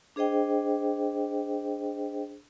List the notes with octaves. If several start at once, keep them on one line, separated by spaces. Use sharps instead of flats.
D4 G#4 C5 D#5 G5